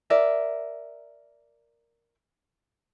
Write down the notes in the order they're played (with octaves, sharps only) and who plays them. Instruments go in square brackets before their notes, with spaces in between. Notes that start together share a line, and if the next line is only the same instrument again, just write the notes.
[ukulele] A#4 D5 E5